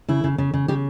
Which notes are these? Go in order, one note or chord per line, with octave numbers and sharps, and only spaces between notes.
C#3 E4
C#3
C#3
C#3
C#3 G4